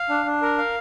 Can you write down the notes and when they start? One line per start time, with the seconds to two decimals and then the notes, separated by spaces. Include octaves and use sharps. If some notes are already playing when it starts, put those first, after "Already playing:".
Already playing: F5
0.09 D4
0.26 D4
0.42 A#4
0.58 F5